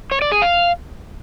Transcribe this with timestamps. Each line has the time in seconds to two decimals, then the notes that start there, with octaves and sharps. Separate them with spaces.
0.11 C#5
0.22 D5
0.32 G#4
0.42 F5